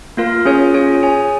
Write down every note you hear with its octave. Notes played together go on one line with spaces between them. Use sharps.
A#3 F4 A#4 F5
C#4 F4 G#4 C#5
C#4 F4 G#4 C#5
G#4 C#5 G#5